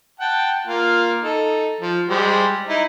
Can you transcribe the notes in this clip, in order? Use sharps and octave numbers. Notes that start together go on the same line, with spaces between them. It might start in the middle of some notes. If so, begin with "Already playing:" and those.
F#5 G5 A5
A#3 F4
D#4 A4
F3
G3 G#3 C5
D#4 E4